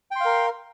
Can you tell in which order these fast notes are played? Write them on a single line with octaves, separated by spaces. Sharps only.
G5 C6 F5 A#4